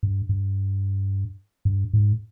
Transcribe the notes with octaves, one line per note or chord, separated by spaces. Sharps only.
G2
G2
G2
G#2